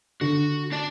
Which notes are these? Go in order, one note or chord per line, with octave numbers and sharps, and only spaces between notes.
D3 F#4
D4 D5 A5